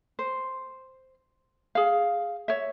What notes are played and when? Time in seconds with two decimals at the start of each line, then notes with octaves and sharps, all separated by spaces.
0.19 C5
1.75 G#4 F5
2.48 C#5 E5